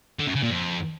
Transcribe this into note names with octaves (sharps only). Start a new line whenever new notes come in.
D3
F#2
C#3
A#2
F2